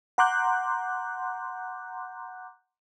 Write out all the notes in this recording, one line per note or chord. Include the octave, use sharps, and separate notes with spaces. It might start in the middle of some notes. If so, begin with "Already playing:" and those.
F#5 A#5 C6 D6 F#6 G6